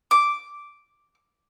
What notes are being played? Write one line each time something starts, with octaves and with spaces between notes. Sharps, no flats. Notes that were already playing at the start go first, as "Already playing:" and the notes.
D6